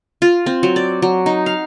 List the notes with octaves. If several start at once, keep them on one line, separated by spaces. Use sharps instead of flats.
F4
C4
F#3
D5
F#3
D#4
F5